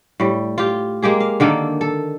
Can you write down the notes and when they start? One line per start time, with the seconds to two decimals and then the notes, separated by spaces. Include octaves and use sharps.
0.20 A2 G3
0.58 F4 G4
1.03 G#3 A#3 G4 G#4
1.20 F5
1.40 D3 D#3 A#3 A4
1.81 A4